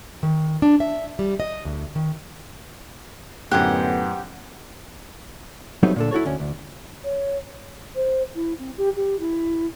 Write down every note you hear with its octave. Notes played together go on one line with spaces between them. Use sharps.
D#3
D4
E5
G3
D#5
D2
D#3
F#2 A2 D3 B3 G4 C5 F#5 G#5
F#3 G3 A3 B3 C4 D#4
A#2 D3 A4
E4 F#4 A4 C#5
D2 C#4
D2
C#5
C5
E4
C4
G4
G4
E4